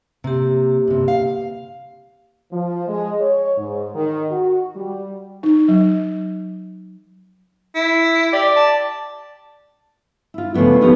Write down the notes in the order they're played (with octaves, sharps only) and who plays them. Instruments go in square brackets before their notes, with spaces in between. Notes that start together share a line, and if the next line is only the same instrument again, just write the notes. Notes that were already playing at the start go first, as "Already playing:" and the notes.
[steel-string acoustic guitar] C3 [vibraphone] A#3 G4
[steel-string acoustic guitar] G2 C3
F5
[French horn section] F3
G#3
C#5
G#2
D#3
F#4
G3
[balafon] D#4
F#3
[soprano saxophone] E4
[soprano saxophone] G4 [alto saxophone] D5
[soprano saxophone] A5
[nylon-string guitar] E4 F4
C#3 F3 A3 B3 D4
D#3 F3 B3 C#4 G4 A#4